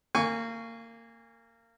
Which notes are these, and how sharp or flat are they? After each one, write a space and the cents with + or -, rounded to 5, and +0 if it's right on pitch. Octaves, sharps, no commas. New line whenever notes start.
A#3 -25 G#5 -20 C#6 +20